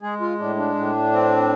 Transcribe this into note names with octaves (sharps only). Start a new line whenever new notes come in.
G#3 G#4
F4
A2 D4
D4
A2
C4